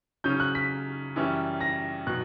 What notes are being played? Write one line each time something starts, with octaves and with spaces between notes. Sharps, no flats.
C#3 F#3 C#4 G6
F#6
B6
F#2 E3 G3 C#4
A#6
B2 F#3 F#6